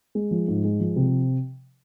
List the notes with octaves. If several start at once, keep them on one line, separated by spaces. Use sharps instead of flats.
G#3
F3
G#2
G#3
F3
C3